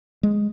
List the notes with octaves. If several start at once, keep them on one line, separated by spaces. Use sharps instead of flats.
G#3